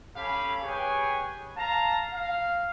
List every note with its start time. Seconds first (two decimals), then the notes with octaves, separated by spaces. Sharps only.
0.17 C#4 G4 A4 F5 B5
0.64 G4 G#4 B4 C#5 G5 G#5
1.57 F5 A5 A#5
2.14 F5